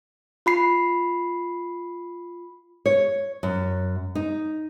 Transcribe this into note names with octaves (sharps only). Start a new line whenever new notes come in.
F4 B5 C7
C#5
F#2
D#4